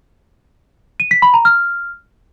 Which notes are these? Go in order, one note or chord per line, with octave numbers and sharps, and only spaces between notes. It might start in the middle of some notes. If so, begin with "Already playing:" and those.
D#7
B6
B5
A#5
F6